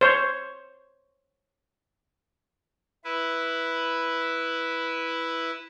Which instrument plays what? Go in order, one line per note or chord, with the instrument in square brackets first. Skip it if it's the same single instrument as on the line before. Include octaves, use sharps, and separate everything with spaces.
[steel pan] C5 C#5
[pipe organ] E4 B4